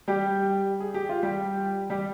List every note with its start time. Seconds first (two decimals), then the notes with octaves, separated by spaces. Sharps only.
0.08 G3 G4
0.80 G#4
0.94 G4
1.09 F4
1.23 G3 G4
1.90 G3 G4